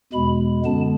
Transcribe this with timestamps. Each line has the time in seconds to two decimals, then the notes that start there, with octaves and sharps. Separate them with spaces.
0.13 E2 B2 G#3 B5
0.65 F#2 D3 G#3 B3 A5